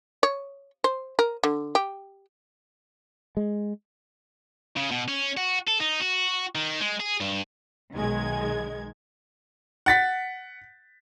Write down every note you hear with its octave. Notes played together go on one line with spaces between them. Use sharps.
C#5
C5
A#4
D3
G4
G#3
C#3
B2
C#4
F#4
A4
D#4
F#4
D#3
G#3
G#4
G2
B1 D#3 G#3 G#6
F#5 A6 B6